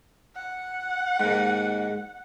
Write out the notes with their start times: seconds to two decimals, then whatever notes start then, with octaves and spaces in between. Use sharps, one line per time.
0.35 F#5
1.20 D#2 G#2